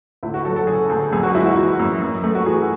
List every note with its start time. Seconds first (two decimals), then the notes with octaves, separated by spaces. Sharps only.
0.23 D2 E4
0.34 F#4
0.45 F#3 A4
0.56 A4
0.67 C#3 G#4
0.89 D2
1.12 F#2 G#4
1.23 F#4
1.34 G#3 E4
1.46 F#4
1.57 E3
1.79 F#2
2.02 F#2
2.24 A3
2.35 F#4
2.46 E3 G#4